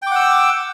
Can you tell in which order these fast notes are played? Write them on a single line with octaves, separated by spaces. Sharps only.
G5 D6 F#5 E6